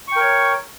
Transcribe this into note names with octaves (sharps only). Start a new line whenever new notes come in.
A#4 C#5 G5 C#6